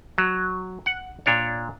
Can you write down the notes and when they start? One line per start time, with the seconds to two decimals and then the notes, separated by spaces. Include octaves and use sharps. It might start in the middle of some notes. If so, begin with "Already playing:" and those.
0.18 F#3
0.86 F#5
1.26 A#2 D4 C#5